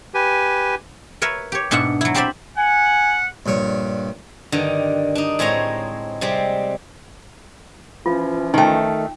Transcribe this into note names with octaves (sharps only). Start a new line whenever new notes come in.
G4 B4 G#5
A#4 B4 C#5 E5
G4 C#5
G#2 B2 D4 E5 F#5
F#3 E4
C4 G4 C5 D5 E5 B5
F#5 G#5
A#1 G2 C#5
G2 D3 D#3
D4 D#4
A2 G#3 C4 C#5 A#5
C3 G3 G#3 C4
E3 F3 C#4 F4
D#3 A3 D#4 G5